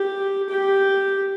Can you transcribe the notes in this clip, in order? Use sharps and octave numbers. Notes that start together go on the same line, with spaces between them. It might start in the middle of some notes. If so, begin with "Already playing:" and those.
Already playing: G4
G4